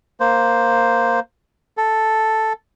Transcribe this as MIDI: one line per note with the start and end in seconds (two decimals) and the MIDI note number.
0.20 1.20 58
0.20 1.20 72
1.77 2.53 69